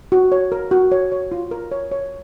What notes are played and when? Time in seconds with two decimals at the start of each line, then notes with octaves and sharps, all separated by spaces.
0.12 F#4
0.32 C#5
0.52 A#4
0.71 F#4
0.92 C#5
1.12 C#5
1.32 F4
1.51 A#4
1.72 C#5
1.91 C#5